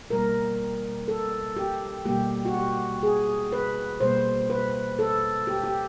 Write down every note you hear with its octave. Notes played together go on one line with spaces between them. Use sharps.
B2 G3 A#3 A#4
A4
G4
B2 G3 A#3 G4
F#4
G4
G#4
B4
B2 G3 A#3 C5
B4
A4
G4
G4